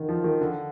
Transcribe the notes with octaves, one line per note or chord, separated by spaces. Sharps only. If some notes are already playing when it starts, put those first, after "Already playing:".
Already playing: D3 D#3
F3
D#3
D3